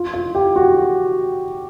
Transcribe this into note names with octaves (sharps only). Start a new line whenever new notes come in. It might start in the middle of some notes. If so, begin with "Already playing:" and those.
Already playing: F4
F4
G4
F#4